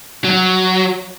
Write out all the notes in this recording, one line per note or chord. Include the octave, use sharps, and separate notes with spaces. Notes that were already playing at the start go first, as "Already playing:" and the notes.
F#3